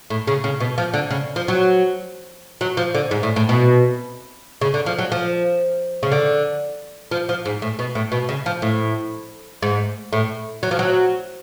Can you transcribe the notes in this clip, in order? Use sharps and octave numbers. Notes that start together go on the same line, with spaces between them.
A2
C#3
C#3
B2
F3
D3
C#3
F3
F#3
F#3
F3
D3
G#2
A2
A2
B2
C#3
D3
F3
F#3
F3
C#3
D3
F3
F3
G#2
A2
B2
A2
B2
C#3
F3
A2
G#2
A2
F#3
F3
F#3